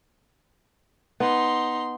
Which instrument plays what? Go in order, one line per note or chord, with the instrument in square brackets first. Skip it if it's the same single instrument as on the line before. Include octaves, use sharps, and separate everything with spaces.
[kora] B3 [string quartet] D#4 C6